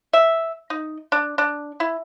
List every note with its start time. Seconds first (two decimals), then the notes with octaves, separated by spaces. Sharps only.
0.13 E5
0.70 D#4
1.12 D4
1.38 D4
1.80 E4